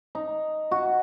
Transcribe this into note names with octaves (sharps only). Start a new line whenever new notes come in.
D#4
F#4